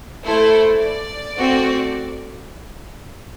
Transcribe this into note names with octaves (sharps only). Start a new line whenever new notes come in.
A3 E4 A4 C5
D5
A3 C4 F#4